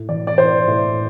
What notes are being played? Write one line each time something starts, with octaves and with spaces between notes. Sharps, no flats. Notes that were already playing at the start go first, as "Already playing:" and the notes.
Already playing: A2
E3 D5
D5
E3 C5
A2